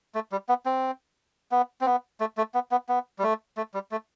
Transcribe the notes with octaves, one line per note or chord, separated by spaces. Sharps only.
A3
G3
B3
C4
B3
C4
B3
A3
A3
B3
B3
B3
G3
A3
A3
G3
A3